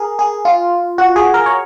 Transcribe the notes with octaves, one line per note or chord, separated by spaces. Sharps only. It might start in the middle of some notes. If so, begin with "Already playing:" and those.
Already playing: G#4 A#4
G#4
F4
F#4
G#4
A#4
C#5